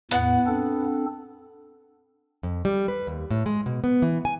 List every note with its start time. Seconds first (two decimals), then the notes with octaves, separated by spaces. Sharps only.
0.11 E2 A2 B3 F#5
0.46 C4 D4 A4
2.43 F2
2.65 G3
2.88 B4
3.07 D#2
3.31 A2
3.46 G#3
3.66 B2
3.84 B3
4.02 E3
4.25 G#5